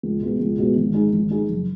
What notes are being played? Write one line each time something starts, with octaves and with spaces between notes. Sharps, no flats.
C#2
B2 G#3 B3
C#2
B2 G#3 B3
G#1
G#2 G#3 D#4 G#4
G#1
G#2 G#3 D#4 G#4
F#1